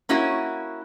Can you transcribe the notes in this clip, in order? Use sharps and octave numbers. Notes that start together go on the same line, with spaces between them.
A#3 C#4 E4 F#4